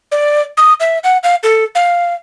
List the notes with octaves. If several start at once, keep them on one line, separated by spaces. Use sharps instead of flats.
D5
D#6
E5
F#5
F5
A4
F5